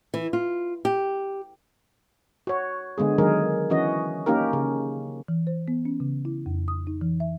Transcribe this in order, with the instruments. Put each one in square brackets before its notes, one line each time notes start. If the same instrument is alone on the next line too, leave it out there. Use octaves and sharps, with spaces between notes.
[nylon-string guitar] E3
F4
G4
[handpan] F#4 C#5
D3 G#3 B3 G#4
D#3 F#3 G#3 G#4 A#4
E3 C#4 F#4 D#5
A#3 C#4 D#4 G4 A#4
C#3
[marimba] E3
C5
B3
C#4
C#3
E4
F2
D#6
D#4
E3
E5